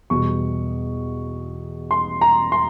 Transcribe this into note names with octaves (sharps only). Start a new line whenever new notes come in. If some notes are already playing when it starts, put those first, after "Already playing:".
E2 B2 G3 C#6
C6
A#5
C6